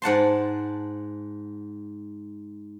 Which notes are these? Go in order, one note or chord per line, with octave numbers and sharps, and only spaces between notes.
G#2 F#5 A5 C6